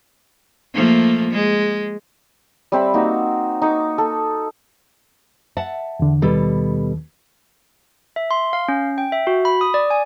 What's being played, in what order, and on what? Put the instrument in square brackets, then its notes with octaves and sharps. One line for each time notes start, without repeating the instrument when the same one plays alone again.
[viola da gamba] F3 A3 A#3
G#3
[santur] G3 C4 E5 B5
A#3 D#4 F#4
D#4 C#6 D6
A4
[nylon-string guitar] E5 F#5 A5
[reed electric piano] E2 D3
[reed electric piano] D#2 D#3 [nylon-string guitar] B2 G3 A4
[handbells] E5
C6
F5
C#4
G5
E5
F#4
B5
D#6
D5
G#5